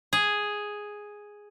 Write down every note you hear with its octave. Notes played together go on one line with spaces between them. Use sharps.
G#4